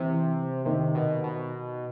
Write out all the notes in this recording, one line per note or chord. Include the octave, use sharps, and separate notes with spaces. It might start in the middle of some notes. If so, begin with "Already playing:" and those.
Already playing: C3 E3
C3 D#3
B2
B2